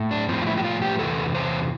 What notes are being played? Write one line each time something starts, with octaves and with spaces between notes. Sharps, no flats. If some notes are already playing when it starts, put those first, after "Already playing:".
Already playing: A2
D4
A2 F3 C4
F4
E4
G4
F4
G4
E2 C3 E3 A4
C5